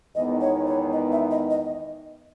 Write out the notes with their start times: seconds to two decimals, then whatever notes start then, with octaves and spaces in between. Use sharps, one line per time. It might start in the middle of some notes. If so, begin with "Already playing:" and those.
0.15 E2 D#3 G#3 B3 D#4 D#5
0.41 C#5
0.67 C#5
0.93 D#5
1.12 E5
1.31 D#5
1.50 D#5